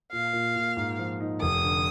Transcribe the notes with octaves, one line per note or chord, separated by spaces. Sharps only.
A#2 F5
A#2
A#2
G#2
F3
D#4
F1 D#6
D3